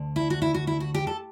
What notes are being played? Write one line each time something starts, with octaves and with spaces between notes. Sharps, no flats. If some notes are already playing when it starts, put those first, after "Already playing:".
Already playing: D2 D3
E4
F#4
E4
F#4
E4
F#4
G4
A4